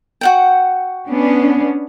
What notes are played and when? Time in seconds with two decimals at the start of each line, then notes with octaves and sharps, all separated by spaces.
0.21 F#4 F#5 G5
1.08 B3 C#4 D4